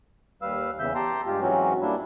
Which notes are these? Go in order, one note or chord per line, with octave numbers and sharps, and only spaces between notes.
D#2 G3 B4 F5 E6
E2 C#3 E3 E5 G6
G4 G5 A5 A#5 C6
G2 G#3 F4 G4
G#2 E3 F#3 C4 C#4 F#4
G3 A#3 D4 E4